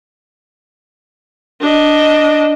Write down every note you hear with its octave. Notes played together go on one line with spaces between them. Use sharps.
D4 D#5